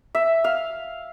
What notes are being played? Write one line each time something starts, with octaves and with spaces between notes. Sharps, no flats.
E5
F5